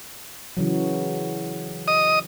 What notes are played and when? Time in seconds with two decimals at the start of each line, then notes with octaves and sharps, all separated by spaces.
0.57 C#3 E3 F#3
1.88 D#5 D#6